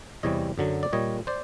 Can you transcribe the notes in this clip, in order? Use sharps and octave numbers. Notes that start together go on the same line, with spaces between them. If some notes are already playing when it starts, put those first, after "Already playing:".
E2 C3 E3 G3 C#5 D#5
F#2 D3 F#3
D5
A#2 G3 C#5 D#5
C5 D5